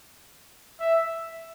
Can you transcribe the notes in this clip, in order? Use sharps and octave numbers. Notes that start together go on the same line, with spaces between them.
E5